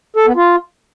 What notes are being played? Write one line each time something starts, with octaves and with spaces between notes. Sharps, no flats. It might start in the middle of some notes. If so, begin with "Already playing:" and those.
A4
B3
F4